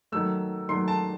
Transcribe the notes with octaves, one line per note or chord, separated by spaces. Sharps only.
D#3 F#3 A3 E6
D#3 F#3 A3 C6
A5